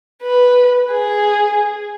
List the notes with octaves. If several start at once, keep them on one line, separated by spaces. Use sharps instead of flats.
B4
G#4